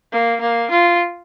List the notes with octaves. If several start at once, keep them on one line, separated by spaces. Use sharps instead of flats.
A#3
A#3
F4